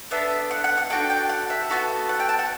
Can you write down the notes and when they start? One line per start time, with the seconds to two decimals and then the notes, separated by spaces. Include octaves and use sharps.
0.11 B3 D4 A4 E5
0.51 F#5
0.64 F#5
0.78 F#5
0.90 D4 F#4 A4 G5
1.10 G5
1.29 F#5
1.50 E5
1.70 B3 F#4 A4
2.09 F#5
2.20 G5
2.29 A5
2.39 F#5